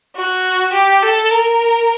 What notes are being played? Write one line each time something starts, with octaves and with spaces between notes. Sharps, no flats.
F#4
G4
A4
A#4